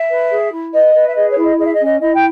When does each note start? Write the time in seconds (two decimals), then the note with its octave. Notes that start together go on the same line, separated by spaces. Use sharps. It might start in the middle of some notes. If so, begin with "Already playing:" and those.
Already playing: E5
0.09 B4
0.29 G#4
0.52 E4
0.72 B4 D#5
0.94 B4
1.08 E5
1.15 G#4 D#5
1.30 C#5
1.37 E4
1.43 D#5
1.57 G#4 D#5
1.65 E5
1.72 D#5
1.79 C#4
1.86 D#5
2.01 E4 D#5
2.16 G5